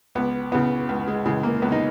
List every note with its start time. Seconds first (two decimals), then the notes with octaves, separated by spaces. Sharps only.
0.15 C#2 B3
0.52 C#3 E3 B3
0.89 C#2
1.07 G#3
1.25 C#3 E3 G#3
1.43 A#3
1.62 C#2 B3
1.72 D#4